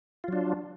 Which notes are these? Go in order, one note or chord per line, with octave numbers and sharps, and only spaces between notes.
F#3 D4 F4